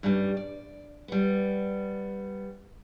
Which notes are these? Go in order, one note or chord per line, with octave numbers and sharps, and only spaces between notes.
G2 C#3 G3
D5
G3 B3